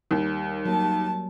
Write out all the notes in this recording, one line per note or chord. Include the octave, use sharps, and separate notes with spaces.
D#2 G3
F#3 A#3 A5